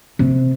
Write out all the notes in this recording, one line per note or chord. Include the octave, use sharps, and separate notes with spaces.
C3